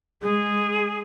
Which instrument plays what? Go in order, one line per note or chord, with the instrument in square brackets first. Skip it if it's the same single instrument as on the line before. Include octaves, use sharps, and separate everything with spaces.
[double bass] G#3 [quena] G#4